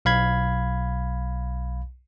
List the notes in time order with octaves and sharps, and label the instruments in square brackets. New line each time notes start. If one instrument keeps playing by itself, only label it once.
[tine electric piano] B1 F5 B5 G#6